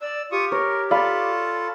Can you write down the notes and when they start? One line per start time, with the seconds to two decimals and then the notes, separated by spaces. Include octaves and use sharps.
0.01 D5 E6
0.32 F4 G4 C#6 D#6
0.52 A#4 C#5
0.91 F4 A4 D5 F5 B5